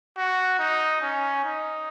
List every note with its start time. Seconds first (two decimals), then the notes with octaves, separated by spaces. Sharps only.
0.17 F#4
0.59 D#4
1.02 C#4
1.44 D#4